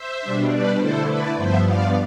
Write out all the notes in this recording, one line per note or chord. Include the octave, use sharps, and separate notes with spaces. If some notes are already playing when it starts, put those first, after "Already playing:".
Already playing: C5 E5
B2 G3 D4
B4 D5
D3 A3 E4 A4 C5
B4 D5
G2 F3 B3 C5 E5
D5 F5